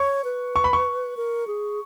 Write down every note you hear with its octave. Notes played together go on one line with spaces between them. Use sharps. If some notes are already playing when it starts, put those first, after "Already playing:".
Already playing: C#5 C#6
B4
C#6
B5
C#6
A#4
G#4